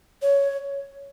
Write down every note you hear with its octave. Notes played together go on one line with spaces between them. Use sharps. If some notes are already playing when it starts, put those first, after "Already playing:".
C#5